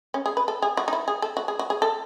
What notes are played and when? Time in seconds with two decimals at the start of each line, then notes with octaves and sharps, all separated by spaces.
0.14 C#4
0.26 G#4
0.37 B4
0.48 A4
0.62 G#4
0.77 F#4
0.88 D#4
0.93 E4
1.08 G#4
1.22 A4
1.37 F#4
1.48 G#4
1.59 F#4
1.70 G#4
1.82 A4